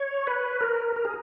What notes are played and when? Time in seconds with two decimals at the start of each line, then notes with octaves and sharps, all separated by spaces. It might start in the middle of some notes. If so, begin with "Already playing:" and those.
Already playing: C#5
0.27 B4
0.61 A#4
0.96 A#4
1.05 G#4